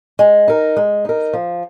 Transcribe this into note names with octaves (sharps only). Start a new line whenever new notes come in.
G#3
D#4 A#4
G#3
D#4 A#4
F3